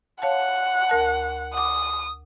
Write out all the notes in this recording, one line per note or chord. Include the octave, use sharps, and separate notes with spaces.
C#5 F5 F#5 A5
D2 A#4 A5
F#5 D6 D#6